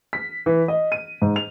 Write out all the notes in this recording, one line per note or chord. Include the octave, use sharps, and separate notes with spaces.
B6
E3
D#5
D#7
G#2
F7